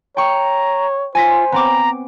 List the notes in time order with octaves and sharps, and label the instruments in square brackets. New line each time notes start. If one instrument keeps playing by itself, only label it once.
[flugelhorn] C#5 [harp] G5 C#6 [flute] A#5
[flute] F4 [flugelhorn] C5 [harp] G#5 A#6 B6
[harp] B3 C4 D6 [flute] A#5